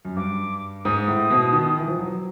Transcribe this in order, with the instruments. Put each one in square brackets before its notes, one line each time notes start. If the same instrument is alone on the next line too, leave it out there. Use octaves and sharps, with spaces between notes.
[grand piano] F#2
[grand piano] G2 [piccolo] D6
[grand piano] G#2 [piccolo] D#6
[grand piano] A2
B2
D#3
E3
F3
F#3